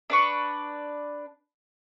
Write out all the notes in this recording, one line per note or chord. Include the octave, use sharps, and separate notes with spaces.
D4 B4 C#6